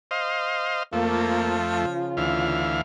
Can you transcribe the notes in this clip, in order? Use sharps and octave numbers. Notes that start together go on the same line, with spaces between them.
C5 D#5 F5
F2 F3 A3 A#3
C#3 F4
D2 E3 F5